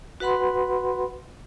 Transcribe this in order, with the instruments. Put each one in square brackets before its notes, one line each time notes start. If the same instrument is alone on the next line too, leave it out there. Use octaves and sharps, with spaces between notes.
[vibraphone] F#4 B4 F#5 B5 C6